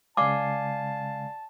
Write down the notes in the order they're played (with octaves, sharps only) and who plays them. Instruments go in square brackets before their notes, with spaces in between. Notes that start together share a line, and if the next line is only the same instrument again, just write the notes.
[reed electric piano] C#3 G#3 [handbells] D5 F5 G#5 [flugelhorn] A5 [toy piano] D6